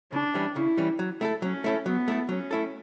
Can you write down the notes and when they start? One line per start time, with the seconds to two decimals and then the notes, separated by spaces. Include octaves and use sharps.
0.12 C#3 D4
0.34 E3 G3 C#4
0.56 C#3 E4
0.77 E3 G3 C#4
0.99 F#3
1.21 A3 E4 A4
1.42 F#3 C#4
1.64 A3 E4 A4
1.86 F#3 B3
2.08 A3 E4 A4
2.29 F#3 C#4
2.51 A3 E4 A4